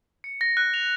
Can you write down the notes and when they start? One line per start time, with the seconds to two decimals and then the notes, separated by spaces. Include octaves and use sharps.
0.24 C#7
0.41 A#6
0.57 F#6
0.74 F7